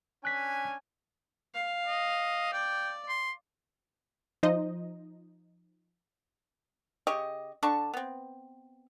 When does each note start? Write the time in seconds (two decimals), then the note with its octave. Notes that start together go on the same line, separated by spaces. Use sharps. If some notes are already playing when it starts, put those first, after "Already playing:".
0.25 C#4 D4 G#5 F#6 B6
1.55 F5
1.86 D#5
2.53 D5 G5
3.08 C6
4.43 F3 D#4 C5 D#5
7.07 C#3 G4 D#5 C#6
7.63 D3 D4 A5 C#6
7.93 B3 C4